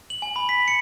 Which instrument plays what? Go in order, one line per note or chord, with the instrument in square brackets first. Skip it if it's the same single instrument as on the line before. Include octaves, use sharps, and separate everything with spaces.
[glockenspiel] F#7
G#5
B5
B6
C#7